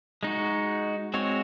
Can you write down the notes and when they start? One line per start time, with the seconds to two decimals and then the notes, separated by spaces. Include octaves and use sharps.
0.23 G#3 D#4 F#4
1.14 G#3 C4 F#4 C#5